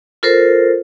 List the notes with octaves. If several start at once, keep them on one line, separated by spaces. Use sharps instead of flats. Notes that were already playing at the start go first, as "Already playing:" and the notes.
F4 A4 A#4 C5